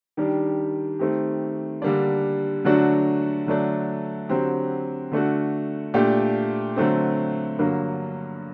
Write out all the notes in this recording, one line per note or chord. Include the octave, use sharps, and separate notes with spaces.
D#3 G3 D4 G4
D#3 A3 C4 G4
D3 G3 A#3 D4
D3 F#3 A3 D4 F#4
D3 F#3 A3 D4
D3 F#3 C4 G4
D3 A3 D4 F#4
A#2 A3 D4 G4
D3 F#3 A3 C4
G2 D3 F#3 A#3